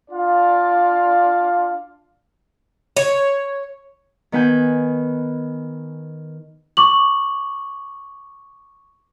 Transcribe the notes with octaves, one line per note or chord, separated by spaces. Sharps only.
D4 F4 D5 F5
C#5
D#3 B3 B4 G#5 G6
C#6 D6 F#7